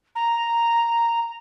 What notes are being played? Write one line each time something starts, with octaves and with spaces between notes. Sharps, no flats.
A#5